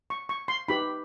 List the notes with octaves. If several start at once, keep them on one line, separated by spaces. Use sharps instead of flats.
C#6
C#6
C6
D#4 G4 B4 B5